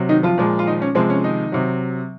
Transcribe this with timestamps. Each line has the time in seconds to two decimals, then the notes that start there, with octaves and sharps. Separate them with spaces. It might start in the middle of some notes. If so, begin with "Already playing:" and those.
Already playing: C3 F#3
0.09 D#3 D#4
0.23 F3 F4
0.38 A#2 F3 G#3
0.59 F4
0.66 D#3 D#4
0.82 C#4
0.95 C3 F3 G#3 C4
1.10 C#4
1.24 D#3 D#4
1.52 C3 F#3